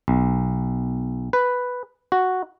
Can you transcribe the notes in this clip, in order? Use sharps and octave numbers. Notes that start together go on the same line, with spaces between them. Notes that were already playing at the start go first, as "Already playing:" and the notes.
B1
B4
F#4